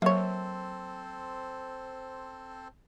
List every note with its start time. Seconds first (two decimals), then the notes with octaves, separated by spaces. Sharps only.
0.02 F#3 A#3 C4 A4 C5 C#5